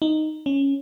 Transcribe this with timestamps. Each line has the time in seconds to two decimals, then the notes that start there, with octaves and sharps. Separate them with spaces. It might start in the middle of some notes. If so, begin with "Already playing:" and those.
0.02 D#4
0.46 C#4